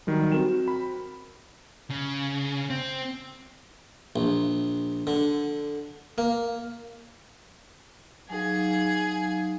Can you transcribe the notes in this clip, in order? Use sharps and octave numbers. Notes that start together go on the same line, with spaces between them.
D#3 F#3 G3
C4 F#4 A#4 E7
B5
C#3
C4
A#1
D3
A#3
F#3 D#4 G#4 F5 G#5